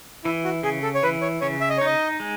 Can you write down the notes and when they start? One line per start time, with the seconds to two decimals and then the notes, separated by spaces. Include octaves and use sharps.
0.24 E3 E4
0.44 F#4
0.63 C#3 G#4
0.83 A4
0.95 C#5
1.03 E3 B4
1.22 C#5
1.41 C#3 C#5
1.61 E5
1.69 D#5
1.78 C#5
1.81 D#4 D#5
2.20 G#3